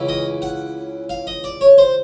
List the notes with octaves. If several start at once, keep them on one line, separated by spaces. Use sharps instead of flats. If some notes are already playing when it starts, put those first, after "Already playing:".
Already playing: C#2 C#3 E3
D#5
F#5
F5
D#5
D5
C#5
C5